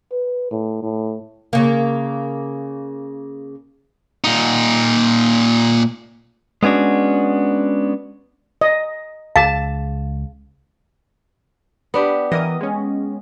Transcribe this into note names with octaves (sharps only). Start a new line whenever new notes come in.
B4
A2
A2
C#3 A#3
A#2 D#4
G#3 B3 C#4 D4 F#4
D#5
C#2 G#4 F5 A5
B3 D4 G4
E3 A#4 D#5 D#6
G#3 C#4